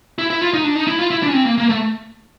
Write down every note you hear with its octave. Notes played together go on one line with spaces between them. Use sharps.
E4
E4
F4
D#4
D4
D#4
E4
F4
E4
D4
C#4
C4
A#3
A#3
A3